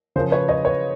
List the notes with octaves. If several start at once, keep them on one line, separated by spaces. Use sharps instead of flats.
C#3 F3 A#4 C5
B4 C#5
C#5 D#5
B4 C#5